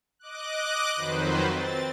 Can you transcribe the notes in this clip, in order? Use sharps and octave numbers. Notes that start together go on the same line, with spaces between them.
D#5 D6 F#6
F2 D#3 F#3 B4 C5
C4 A6